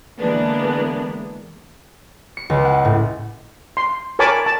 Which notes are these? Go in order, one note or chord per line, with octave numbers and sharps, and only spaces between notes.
D3 E3 G#3 A#3 B3 D4
C#7
C#2
F#5
A2
C6
A#4 C#5 G#5 A5 B5 D6
A5